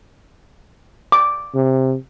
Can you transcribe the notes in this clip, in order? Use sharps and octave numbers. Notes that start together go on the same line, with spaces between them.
D6
C3